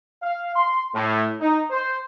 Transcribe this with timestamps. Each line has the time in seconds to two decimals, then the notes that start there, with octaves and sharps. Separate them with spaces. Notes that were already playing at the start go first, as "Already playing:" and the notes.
0.22 F5
0.55 C6
0.94 A2
1.40 D#4
1.71 C5